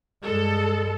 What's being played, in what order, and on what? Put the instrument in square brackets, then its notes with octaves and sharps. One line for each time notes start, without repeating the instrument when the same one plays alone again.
[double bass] G2 G#3 [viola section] A4